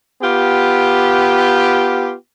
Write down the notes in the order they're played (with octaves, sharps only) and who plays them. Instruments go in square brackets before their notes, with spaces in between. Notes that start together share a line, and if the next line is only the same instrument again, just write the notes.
[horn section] B3 F4 G4